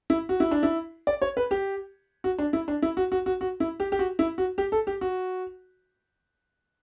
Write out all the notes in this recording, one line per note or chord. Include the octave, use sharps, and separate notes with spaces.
E4
F#4
E4
D4
E4
D5
C#5
B4
G4
F#4
D4
E4
D4
E4
F#4
F#4
F#4
F#4
E4
G4
G4
F#4
E4
F#4
G4
A4
G4
F#4